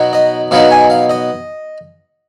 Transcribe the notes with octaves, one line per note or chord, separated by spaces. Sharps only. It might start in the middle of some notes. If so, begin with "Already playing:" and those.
Already playing: B2 F#3 B3 D#4
D#5
B2 F#3 B3 D#4 F5
G#5
F5
D#5